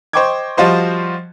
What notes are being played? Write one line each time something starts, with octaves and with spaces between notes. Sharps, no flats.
C5 D#5 G5 C#6 D6 G#6
F3 G3 F4 F#4 C5 D#5